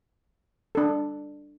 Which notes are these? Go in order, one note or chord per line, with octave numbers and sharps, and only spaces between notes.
D4 A4